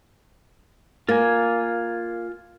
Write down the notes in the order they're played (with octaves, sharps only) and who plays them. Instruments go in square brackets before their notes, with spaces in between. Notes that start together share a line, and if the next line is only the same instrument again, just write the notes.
[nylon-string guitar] A#3 [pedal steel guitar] F4 G#5